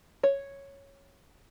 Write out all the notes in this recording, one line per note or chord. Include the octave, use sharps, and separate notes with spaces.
C#5